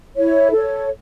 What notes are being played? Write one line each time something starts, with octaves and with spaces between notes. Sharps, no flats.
E4 C#5
A4 C#5